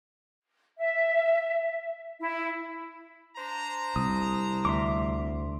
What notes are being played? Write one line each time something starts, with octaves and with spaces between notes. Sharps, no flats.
E5
E4
D4 C5 A#5
C2 D#6
D2 E5 C6 D6